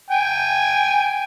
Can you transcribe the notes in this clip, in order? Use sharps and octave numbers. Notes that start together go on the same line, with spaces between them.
G5 G#5